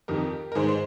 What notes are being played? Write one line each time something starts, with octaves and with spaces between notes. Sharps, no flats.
F2 D#3 G4 A#4
A#4
G#2 D#3 G#4 C5
C5